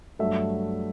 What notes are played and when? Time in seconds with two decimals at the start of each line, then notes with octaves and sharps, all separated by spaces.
0.19 G2 F#3 A3 E5